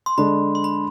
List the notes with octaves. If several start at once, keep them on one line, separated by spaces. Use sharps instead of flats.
C6
D3 G#3 D4 B5
C6
B5